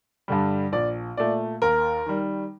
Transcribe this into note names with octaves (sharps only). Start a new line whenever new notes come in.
G2 D3 G3
A#1 D5
A#2 A3 D5
D#2 A#4
D#3 G3